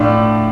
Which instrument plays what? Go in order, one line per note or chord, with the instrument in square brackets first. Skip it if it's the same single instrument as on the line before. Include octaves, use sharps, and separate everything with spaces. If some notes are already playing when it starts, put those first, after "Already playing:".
Already playing: [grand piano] A2 F3 A3 D4 F4 D5